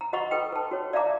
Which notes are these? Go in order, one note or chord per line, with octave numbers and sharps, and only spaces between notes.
A#5
F#4 D#5 F#5 A#5 B5 C#6
A4 B4 G5
B4 A5
F#4 C#5
D5 E5 F5 A5 A#5 D6